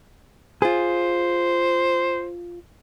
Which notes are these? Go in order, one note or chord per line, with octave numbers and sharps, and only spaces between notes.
F4 G#4 C5